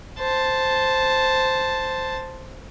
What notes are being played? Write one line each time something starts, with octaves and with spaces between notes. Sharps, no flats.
C5 A5